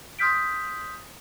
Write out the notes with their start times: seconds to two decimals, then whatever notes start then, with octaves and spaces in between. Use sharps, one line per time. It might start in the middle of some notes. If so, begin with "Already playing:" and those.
0.19 C6 D#6 F6 G6 B6 D7